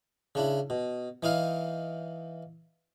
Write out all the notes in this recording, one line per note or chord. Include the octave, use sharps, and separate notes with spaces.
C#3 D4 E4
B2
E3 D#4 E4 F5